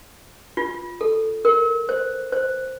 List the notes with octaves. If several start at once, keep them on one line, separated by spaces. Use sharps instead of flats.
F4
A4
A#4
C5
C5